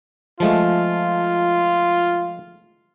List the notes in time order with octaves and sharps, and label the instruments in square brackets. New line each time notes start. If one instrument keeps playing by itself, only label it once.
[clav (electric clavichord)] F3 G#3 A3 [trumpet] F4